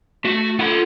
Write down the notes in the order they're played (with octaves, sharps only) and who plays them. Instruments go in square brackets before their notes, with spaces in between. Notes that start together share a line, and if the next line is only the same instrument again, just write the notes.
[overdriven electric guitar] A3 [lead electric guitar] F#4
[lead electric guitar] F4 B5 [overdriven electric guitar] A4 F#5